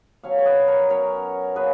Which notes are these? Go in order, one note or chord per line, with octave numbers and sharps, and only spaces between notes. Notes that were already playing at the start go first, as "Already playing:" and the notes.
B2 F#3 C#4 C#5 F5
C#5
B4 D#5
A#4 C#5
B2 F#3 C#4 A#4 C#5
B2 A#3 C#4 G#4 B4